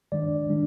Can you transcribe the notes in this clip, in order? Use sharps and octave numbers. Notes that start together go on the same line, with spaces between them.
D#3 G#3 D4 D5
D#3 G#3 D4